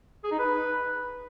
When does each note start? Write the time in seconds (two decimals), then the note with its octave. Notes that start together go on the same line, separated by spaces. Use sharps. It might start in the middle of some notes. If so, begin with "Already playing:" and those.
0.24 G#4
0.31 D#4
0.39 B4